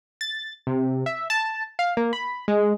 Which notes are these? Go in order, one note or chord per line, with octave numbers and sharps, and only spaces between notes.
A6
C3
E5
A5
F5
A#3
B5
G#3